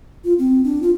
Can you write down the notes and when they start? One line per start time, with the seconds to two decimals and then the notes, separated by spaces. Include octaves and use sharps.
0.24 F4
0.39 C4
0.64 D4
0.82 F4